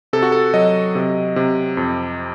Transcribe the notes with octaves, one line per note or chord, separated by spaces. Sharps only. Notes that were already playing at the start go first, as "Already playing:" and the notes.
C3 A4
F#4
A4
F#3 D#5
C3
C3
F2